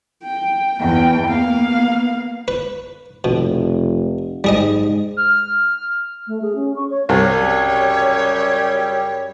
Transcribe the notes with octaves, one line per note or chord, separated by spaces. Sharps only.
G5
E2 G5
A#3 B3 F5
B4
F1 B2
G#2 G3 G#4 D#5
F6
A3
G#4
C#4
C#6
C#5
C2 F#2 C#3 G3 C#5